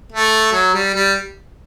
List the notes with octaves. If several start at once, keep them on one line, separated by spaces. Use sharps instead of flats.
A3
F#3
G3
G3